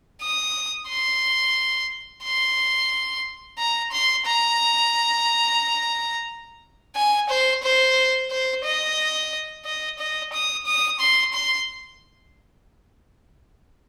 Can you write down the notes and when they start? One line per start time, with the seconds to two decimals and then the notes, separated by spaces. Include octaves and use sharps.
0.22 D#6
0.88 C6
2.24 C6
3.59 A#5
3.92 C6
4.26 A#5
6.96 G#5
7.30 C5
7.63 C5
8.30 C5
8.64 D#5
9.65 D#5
9.99 D#5
10.33 D#6
10.66 D#6
11.00 C6
11.34 C6